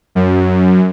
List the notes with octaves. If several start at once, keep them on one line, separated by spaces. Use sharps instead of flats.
F#2